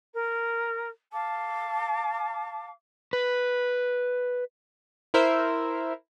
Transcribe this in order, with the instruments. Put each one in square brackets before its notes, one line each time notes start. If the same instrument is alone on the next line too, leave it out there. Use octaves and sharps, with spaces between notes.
[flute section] A#4
[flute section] F5 D6 [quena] A5
[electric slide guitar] B4
[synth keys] E4 A#4 C5 E5